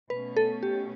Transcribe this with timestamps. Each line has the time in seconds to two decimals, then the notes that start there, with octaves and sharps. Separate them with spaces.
0.10 B2 A3 C#4 B4
0.37 A4
0.63 G4